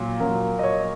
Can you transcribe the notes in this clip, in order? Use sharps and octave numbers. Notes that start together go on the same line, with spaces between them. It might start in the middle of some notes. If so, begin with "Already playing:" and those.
Already playing: A#2 F#3
A#2 F#3 A#4
D#5
C#5